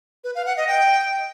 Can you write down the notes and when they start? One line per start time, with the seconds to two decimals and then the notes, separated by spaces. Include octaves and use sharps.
0.24 B4
0.35 F5
0.46 F#5
0.57 D#5
0.68 G5